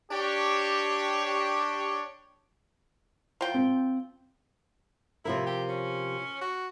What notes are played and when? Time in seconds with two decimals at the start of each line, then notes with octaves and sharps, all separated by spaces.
0.11 D4 G4 C#5
3.41 F3 G5
3.54 C4
5.25 C3 F3 E4 A#4
5.47 G4
5.69 C#4
6.41 F#4